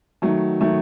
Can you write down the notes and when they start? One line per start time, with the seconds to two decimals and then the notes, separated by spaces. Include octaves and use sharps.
0.22 D#3 F#3 A3
0.61 D#3 F#3 A3